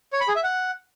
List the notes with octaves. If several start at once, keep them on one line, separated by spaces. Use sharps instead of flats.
C#5
B5
G#4
E5
F#5